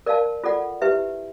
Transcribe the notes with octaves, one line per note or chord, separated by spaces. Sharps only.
A#4 D5 F5 A5
F4 A4 D5 F#5
E4 G4 B4 E5